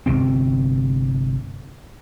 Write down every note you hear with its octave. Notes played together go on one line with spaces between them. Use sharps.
G1 C#2 C3 C4